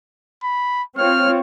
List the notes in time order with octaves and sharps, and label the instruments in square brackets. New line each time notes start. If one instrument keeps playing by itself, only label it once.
[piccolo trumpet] B5
[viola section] C4 F4 C#5 [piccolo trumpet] F6